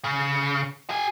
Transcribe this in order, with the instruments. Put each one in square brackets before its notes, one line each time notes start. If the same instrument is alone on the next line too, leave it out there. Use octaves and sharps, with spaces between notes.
[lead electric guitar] C#3
G4 G#5